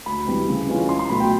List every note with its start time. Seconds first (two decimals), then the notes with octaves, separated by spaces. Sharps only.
0.06 D2 B5
0.26 C3 E3 G3
0.48 C#3
0.68 E3 G#3 C#4 F4
0.89 C#2 C6
0.99 C6
1.10 B2 F#3 A3 B5
1.20 G5